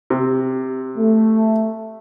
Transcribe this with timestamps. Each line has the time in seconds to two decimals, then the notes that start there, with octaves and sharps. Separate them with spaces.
0.10 C3
0.97 A3